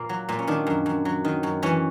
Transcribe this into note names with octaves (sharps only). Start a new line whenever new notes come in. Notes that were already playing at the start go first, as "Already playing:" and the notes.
Already playing: A#2 A#3
F#3
A#2
C#4
D#3 D4
F#2
F#2
F#3
D#3
F#2
E3 C#4